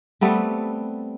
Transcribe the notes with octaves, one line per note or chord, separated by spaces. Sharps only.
G3 A3 B3 C4